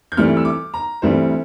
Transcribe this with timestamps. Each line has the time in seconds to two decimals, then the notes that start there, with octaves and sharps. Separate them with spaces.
0.12 G6
0.17 D2 C3 E3 G3 F6
0.37 E6
0.45 D6
0.74 A#5
1.02 D2 C3 E3 G3 C5